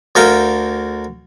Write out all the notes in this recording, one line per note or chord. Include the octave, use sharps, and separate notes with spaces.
D2 A4 A#4 F5 G5